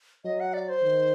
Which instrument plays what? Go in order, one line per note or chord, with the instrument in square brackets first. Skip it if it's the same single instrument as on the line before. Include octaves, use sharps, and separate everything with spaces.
[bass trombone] F#3 [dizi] D#5
[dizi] F#5
D5
C5
[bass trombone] D#3